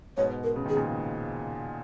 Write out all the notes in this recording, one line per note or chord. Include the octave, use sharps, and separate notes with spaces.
G#2 B2 C#5
A#4
C#3
D#3 G#4
A#2 C#3